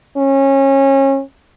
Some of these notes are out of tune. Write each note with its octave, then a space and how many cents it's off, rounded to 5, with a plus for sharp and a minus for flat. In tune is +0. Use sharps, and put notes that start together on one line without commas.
C#4 -25